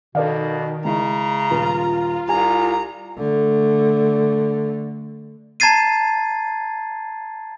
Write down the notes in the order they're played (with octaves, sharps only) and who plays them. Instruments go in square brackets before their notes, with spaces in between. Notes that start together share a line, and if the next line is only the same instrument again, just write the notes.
[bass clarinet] B2 [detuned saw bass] D#3 [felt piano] A4 D5 F5
[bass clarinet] C#3 [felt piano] G#3 E4 [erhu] A#5
[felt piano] D#1 [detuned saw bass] F4
[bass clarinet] C2 [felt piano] G4 G#5 [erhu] A#5
[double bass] D3 A3
[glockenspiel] A5 A#5 G#6 A6 C7 D#7